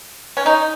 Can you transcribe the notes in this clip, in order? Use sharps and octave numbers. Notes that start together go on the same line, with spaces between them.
C#4
D#4